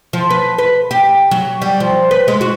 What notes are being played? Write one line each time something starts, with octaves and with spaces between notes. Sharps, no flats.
F3
B4
B4
G4
F#3
G3
F3
B4
G#3
F#4